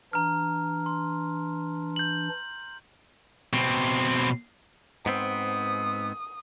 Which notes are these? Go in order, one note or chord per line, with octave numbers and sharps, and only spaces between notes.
E3 D4 A#5 F6
C6
G6 F#7
B2 C4
G#2 B3 C4 D#6